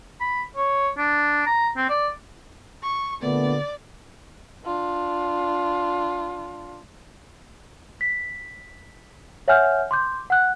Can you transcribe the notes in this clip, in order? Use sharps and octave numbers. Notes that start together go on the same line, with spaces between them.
B5
C#5
D4
A#5
C4
D5
C#6
A#2 D3 A3 B3 D5
D4 F4
B6
C#5 E5 F#5 G#5 F6 G6
C6 D6 G6
F#5 F#6